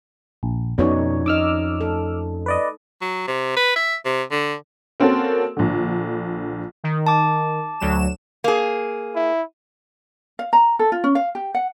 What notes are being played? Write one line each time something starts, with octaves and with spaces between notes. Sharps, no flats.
A#1
F2 B2 C4 C#4 D#4 C#5 D5
D#4 D#5 D6 E6 F6
A4
B4 D5 D#5
F#3
C3
B4
E5
C3
D3
A#3 C4 C#4 F#4 A4
A#1 D3
D#3
A5 D6
D2 F#3 E7
A#3 G#4
E4
F5
A#5
A4
F4
C#4
F5
G4
F#5